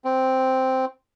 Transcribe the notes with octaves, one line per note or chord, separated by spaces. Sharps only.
C4